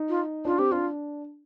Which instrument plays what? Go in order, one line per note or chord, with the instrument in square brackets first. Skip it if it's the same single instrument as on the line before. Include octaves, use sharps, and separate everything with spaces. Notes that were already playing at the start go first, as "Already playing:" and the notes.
Already playing: [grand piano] D#4
[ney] F4
[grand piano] D4 [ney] F4
[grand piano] C4 [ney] G4
[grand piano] D4 [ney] F4